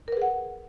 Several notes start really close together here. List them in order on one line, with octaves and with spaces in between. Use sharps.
A#4 B4 G#4 F#5